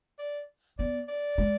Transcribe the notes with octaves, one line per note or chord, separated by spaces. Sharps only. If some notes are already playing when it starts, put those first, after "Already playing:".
D5
B3 D5
D5
G#3